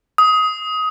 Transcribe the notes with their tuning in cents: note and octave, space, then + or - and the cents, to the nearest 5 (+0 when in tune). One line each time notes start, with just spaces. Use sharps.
D#6 +20